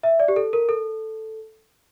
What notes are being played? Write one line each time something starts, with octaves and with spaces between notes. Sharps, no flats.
E5
D5
G4
A4
A#4
A4